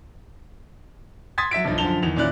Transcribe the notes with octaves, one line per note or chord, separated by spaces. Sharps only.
C6 D#6 G#6 A6 B6
F#3 E5 B6 D7
B1 G2 F3 D#4
F#2 D3 F3 A5 F7 G7
E2 D#3 F7
A#2 D#3 C#4 E4 D5 F#6